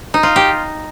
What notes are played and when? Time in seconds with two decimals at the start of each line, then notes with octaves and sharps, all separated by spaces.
0.14 D#4
0.23 F4
0.36 G4